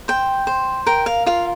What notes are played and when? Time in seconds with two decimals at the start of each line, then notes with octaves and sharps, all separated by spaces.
0.08 C5 G5
0.47 C5
0.86 A#4 G5
1.06 F5
1.26 F4 F5